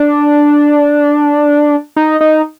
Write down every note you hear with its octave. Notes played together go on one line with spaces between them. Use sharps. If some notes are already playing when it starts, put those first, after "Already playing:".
Already playing: D4
D#4
D#4